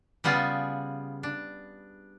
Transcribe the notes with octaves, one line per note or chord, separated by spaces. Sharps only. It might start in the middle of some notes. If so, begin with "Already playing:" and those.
C#3 G3 B3 F4 G#4
D4